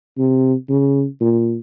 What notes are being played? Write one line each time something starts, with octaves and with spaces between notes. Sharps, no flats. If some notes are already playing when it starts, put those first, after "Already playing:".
C3
C#3
A#2